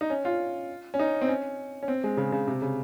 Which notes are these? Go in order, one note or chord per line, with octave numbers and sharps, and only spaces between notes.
D#4
C#4
F4
C#4
D#4
C4
C#4
C#4
C4
G#3
C#3
C#3
C3
C#3